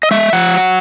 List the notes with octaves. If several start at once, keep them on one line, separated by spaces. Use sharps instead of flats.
D#5
G#3 E5
F3 F#5
F#3